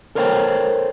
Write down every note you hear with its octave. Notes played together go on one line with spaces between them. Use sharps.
A4 A#4 C5 C#5 F5 G5